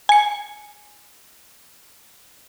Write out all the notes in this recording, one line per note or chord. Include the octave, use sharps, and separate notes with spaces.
G#5 C#7